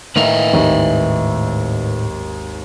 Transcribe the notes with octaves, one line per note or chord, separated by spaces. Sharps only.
A2 D#3 A#3 B4 D#5 E5 F7
G#1 D#2